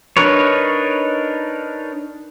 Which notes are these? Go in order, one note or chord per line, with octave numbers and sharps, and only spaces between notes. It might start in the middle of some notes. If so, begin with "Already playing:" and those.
D4 D#4 A#4 B4 C#5